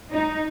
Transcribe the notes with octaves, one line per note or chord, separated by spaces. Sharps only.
D#4